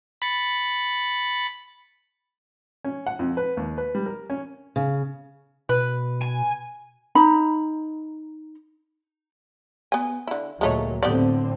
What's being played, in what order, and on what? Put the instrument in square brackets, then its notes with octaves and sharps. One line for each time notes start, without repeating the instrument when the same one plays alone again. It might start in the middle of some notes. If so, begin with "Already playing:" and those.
[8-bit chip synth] B5 A6 C#7
[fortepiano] C#4
F#5
F2
B4
D#2
B4
G3
A#4
C#4
[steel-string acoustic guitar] C#3
[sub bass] B2 [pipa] B4
[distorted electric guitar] G#5
[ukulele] D#4 A#5 B5
[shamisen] B3 G#5
D3 E4
[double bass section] D2 A#2 F#3 [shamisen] G#3 A3 C#5
[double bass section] A2 D3 C4 [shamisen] B3 G4 D5